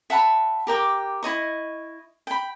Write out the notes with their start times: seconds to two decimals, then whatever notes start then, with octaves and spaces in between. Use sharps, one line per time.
0.10 E5 F#5 A5 B5
0.67 G4 A#4 G5 D6
1.23 E4 C#5 D#5 C#6
2.27 G5 B5